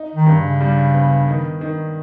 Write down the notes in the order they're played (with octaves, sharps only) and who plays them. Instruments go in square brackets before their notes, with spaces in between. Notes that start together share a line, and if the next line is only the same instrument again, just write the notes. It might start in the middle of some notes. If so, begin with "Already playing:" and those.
Already playing: [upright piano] D#4
[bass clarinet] D#3
[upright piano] G2
[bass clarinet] C#3
[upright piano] G3
B3
D#3
D#3